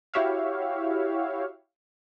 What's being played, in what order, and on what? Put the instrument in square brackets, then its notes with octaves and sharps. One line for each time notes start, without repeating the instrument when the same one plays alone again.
[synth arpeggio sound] E4 F#4 G4 C#5 E5 F5